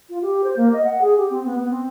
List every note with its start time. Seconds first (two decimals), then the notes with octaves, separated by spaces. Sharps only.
0.09 F4
0.22 G4
0.44 C5
0.57 A#3
0.73 D#5
0.84 F#5
1.01 G#4
1.17 G4
1.30 C4
1.45 B3
1.58 B3
1.70 C4